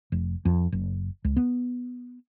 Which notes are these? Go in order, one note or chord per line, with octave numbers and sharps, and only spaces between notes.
F1
F2
F#1
C#2
B3